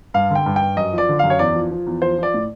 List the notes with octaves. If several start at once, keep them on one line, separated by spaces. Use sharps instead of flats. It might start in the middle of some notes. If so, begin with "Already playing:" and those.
G2 F5
D3
G5
G2
G5
G2
F#2 D#5
F3 D5
D3
F#2 F5
C#5
E2 D5
F3
F3
E2
F3 C5
F3 D5
A2